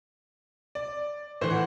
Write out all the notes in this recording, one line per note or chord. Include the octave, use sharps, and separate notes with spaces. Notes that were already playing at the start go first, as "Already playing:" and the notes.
D5
A2 E3 C5
F#5